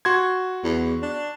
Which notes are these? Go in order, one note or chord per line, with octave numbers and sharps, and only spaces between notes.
F#4 C6 G#6
E2
D4